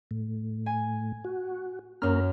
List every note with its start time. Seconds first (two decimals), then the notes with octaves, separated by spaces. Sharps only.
0.11 A2
0.66 G#5
1.25 F#4
2.02 F#2 A#3 C#4 A#4 F6